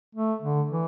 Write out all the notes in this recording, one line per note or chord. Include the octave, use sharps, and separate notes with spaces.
A3
D3
E3